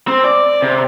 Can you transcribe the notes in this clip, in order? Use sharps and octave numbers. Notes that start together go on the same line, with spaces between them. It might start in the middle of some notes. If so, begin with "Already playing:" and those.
C4
D5
C3